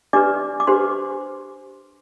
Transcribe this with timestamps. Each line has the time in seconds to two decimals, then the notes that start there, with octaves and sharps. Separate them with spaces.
0.13 D4 G4 B4 D5 D6
0.60 D6
0.67 D4 G4 B4 C5 C6